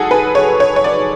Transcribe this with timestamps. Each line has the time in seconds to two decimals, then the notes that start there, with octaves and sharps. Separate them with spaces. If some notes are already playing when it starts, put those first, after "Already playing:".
Already playing: G#2 F#3 G#4 A4 F#5
0.11 B4
0.35 C#5
0.60 C#5
0.76 C#5
0.84 D5